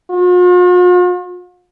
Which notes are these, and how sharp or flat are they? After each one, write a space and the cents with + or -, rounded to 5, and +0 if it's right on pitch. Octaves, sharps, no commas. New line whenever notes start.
F4 +45